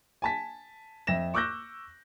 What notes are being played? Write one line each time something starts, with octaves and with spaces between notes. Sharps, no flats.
G#5 A5 B6
F2 E5 A#6 E7
C#6 D6 E6 F#6 G6 A#6